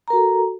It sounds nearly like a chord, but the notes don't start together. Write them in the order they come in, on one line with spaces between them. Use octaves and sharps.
A#5 A#4 F#4 A4